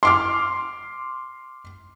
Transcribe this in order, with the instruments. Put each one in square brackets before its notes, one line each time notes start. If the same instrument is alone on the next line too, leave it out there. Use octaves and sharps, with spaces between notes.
[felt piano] C6 D6 F6